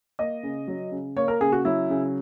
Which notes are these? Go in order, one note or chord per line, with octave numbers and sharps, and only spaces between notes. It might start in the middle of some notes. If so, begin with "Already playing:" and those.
A#3 D#5
C#3
F#3
C#3
A#3 C#5
A#4
C#3 G#4
F#4
F#3 E4
C#3